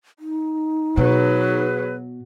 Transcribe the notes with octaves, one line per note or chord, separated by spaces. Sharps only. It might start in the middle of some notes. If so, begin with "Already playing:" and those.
D#4
B2 F#3 G#4 B4